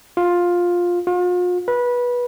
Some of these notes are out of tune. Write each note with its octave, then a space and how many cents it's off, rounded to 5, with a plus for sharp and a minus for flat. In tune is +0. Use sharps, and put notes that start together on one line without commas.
F4 +10
F4 +40
B4 -20